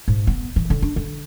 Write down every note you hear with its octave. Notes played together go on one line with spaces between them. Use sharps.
G#2
B3
E3
D3
D4
D3